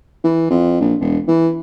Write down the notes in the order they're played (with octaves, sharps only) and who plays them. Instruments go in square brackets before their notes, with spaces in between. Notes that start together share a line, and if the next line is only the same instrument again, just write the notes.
[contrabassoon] E3
F2
A#1
E1
E3